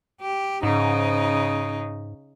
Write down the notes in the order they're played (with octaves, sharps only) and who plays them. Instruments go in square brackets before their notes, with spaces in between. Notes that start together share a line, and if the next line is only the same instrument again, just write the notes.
[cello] G4
[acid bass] G#2 [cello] C#3 D#4